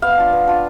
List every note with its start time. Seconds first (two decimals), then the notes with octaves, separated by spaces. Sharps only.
0.02 B3 F5
0.17 D4 F4
0.33 B3
0.47 D4 F4